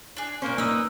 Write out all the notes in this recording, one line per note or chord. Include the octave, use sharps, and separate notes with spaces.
D4 G#4
A#2 A#3 C#4 C5
A#3 D#4 A#4 B4 D#6 E6